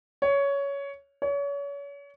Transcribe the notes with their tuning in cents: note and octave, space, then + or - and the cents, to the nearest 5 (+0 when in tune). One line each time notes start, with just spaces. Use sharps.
C#5 +15
C#5 +35